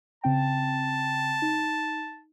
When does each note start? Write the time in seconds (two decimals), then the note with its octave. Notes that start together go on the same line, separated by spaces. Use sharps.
0.24 C#3 C4 G5 A5
1.42 D#4